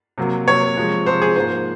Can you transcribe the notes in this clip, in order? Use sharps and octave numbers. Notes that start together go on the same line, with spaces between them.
C3 F#3 A#3
C3 F#3 A#3 C#5
C3 F3 G#3
C3 F3 G#3 C5
G#4
G#2 F3 A#3 C5